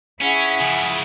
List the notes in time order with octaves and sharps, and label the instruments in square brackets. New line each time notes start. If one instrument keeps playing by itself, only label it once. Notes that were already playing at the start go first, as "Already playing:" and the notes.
[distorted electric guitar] C#4 [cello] E4 [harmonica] G#4 F#5
[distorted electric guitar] C#3 F3